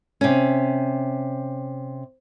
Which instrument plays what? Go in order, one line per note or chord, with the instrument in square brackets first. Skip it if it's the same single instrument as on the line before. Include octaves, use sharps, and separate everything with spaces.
[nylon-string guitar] C3 C#4